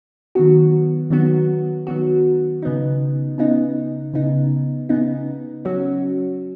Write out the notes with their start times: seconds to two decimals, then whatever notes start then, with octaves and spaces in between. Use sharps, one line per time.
0.35 D#3 F#3 B3 F#4
1.11 D#3 F#3 B3 F#4
1.87 D#3 F#3 B3 F#4
2.62 C#3 B3 D#4
3.38 C#3 B3 D#4
4.14 C#3 B3 D#4
4.89 C#3 B3 D#4
5.65 F#3 C#4 F#4